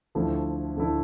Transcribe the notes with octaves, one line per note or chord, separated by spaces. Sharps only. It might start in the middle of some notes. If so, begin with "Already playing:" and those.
D2 D3 F3 A3 E4
D2 D3 F3 A3 E4